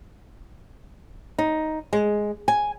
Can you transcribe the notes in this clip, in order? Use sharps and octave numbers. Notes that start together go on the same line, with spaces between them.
D#4
G#3
G#5